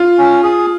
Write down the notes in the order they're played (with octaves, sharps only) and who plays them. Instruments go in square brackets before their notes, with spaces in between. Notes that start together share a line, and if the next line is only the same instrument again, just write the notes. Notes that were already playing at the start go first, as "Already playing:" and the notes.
Already playing: [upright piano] F4
[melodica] C#4
G#4